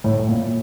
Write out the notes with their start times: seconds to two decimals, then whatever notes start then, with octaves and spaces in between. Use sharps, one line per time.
0.04 A2
0.28 A#2